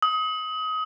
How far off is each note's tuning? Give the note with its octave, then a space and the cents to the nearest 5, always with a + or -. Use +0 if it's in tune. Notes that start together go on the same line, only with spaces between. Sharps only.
D#6 +25